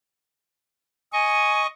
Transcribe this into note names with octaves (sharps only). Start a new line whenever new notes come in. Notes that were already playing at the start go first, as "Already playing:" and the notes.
D#5 G#5 C#6